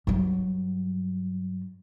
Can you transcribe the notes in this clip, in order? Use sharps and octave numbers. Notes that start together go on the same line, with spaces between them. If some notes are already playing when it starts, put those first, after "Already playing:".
G2 F#3